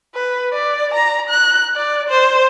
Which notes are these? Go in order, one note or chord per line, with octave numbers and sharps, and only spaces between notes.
B4
D5
A#5
F#6
D5
C5